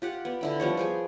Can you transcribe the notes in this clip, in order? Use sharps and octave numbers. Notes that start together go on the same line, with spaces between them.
F4 G4 F#5
B3 D5
D3 E4 G5
F3 G3 B3 C#5
G#4 G5 G#5